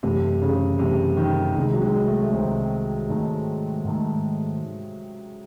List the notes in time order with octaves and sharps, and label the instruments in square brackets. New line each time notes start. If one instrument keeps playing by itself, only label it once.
[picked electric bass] F#2 E3 A3 [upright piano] C3
[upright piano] C#3
[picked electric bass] F#2 E3 A3 [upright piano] C3
[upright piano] D#3
[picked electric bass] C2 C3 D#3 [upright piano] G#3
[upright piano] F#3
G#3
A3
A3
[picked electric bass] C2 C3 D#3 [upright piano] C4
[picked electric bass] G#2 D#3 A3
G#2 D#3 A3